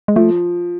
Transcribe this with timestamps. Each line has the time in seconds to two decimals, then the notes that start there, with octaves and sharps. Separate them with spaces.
0.08 G#3
0.16 F3 A3